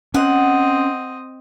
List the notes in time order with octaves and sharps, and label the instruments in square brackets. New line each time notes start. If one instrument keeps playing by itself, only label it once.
[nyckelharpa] C4 D#5 [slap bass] C#4 [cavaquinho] F#5